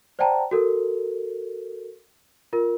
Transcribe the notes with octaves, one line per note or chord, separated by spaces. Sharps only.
C5 D5 F#5 G5 A5 A#5
F#4 A4 A#4
F4 A#4